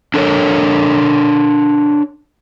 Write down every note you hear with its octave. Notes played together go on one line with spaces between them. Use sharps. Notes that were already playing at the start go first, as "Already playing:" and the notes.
D4 A4 A#4 C#5